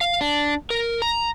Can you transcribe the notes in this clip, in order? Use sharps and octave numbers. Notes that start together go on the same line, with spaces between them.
F5
D4
A#4
A#5